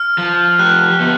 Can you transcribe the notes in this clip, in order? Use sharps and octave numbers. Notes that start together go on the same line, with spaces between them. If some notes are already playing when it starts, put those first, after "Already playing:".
Already playing: F6
F3
G4 F#6
B3